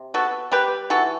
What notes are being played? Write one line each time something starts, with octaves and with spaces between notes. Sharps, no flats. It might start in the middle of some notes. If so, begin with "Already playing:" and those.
Already playing: C3
B3 F#4 A4
G3 G4 B4
E3 F#4 A4